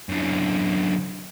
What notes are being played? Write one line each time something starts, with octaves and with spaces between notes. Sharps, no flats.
F#2 D3